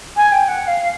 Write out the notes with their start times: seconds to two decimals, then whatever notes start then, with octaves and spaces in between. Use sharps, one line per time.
0.16 G#5
0.32 G5
0.48 F#5
0.63 F#5
0.67 F5